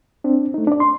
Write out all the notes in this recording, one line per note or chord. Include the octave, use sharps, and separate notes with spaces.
C4 D4
A3 D#4
D4 D5
C6